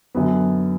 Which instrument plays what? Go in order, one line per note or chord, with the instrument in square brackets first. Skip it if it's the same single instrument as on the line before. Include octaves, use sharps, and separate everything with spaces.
[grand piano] F#2 D3 F#3 B3